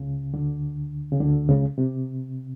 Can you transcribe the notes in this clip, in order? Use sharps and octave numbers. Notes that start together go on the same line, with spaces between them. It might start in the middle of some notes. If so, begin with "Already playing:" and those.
Already playing: C#2 C#3
D2 D3
C#3
D2 D3
C#2 C#3
C3